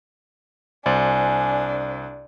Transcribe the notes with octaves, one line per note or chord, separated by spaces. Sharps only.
C2 D4 C5 D5 G#5